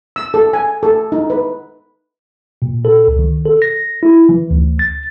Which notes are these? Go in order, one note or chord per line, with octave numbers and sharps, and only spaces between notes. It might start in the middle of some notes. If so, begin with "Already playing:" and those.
E6
A4
G#5
A4
D#4
B4
A#2
A4
C#2
D#3
A4
A#6
E4
E3
D2
A6